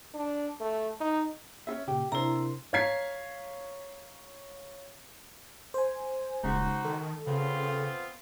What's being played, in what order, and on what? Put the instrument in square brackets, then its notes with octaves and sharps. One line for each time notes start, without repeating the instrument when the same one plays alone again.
[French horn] D4
A3
D#4
[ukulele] C#4 F4 E5
[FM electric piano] A#2 C#3 [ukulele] G4
[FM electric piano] C3 D4 E5 [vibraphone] E4 A#5 [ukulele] A#4 C5
[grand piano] C#5 F5 A#5 G#6 B6 C7
[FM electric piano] C5 G#5
[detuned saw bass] D#1 [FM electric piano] C#3 G#3 [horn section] D#4 F#4 C5
[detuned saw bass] D#3 [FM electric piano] A4
[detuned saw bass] C#3 [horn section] B3 C4 F4